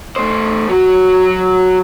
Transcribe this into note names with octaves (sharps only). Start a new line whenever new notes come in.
A3 C5
F#3 F#4